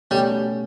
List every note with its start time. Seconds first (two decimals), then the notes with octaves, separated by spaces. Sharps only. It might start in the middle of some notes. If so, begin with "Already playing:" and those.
0.11 B2 G3 A3 C#4